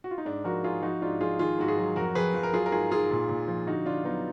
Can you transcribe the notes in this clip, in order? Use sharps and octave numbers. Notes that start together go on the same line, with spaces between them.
F#4
F4
D#4
G#2 D4
F3 F#4 A#4
G#2 F4 G#4
F3 D#4 F#4
G#2 D4 F4
F3 F4 G#4
D#3 F4 G#4
G#2 F#4
F4 G#4
F#3
F2 F#4 A#4
F2 G#4 B4
F3
A#4
F#3 F4 G#4
A#4
G#2 F4 G#4
G#2 F4 G#4
A#2
A#2
F3
D3 D#4 F#4
D3 D4 F4
F#3 B3 D#4